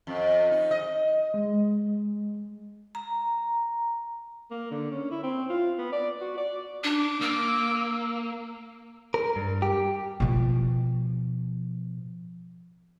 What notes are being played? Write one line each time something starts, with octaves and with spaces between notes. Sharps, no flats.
F2
D#4
D#5
G#3
A#5
A#3
D3
C#4
E4
C4
F4
B3
D5
F#4
D5
D4 D6
A#3 E6
A#4
G2
G4
B2 F3